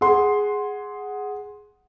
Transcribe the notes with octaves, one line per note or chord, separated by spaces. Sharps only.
G#4 F#5 C6